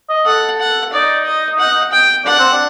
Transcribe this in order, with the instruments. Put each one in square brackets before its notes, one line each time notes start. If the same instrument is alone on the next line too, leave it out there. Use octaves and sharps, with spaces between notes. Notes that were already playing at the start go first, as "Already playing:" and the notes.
[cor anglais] D#5
[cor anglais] A4 [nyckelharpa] F#5
[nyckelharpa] F#5
[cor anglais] D#4 [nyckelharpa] D5
[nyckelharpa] D#5
F#5
G5
[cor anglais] D4 [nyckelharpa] F#5
[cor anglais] C4
D4